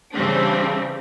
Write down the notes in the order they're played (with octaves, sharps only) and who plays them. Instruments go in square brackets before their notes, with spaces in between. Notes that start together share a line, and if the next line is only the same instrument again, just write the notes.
[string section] C#3 E3 G3 C4 D4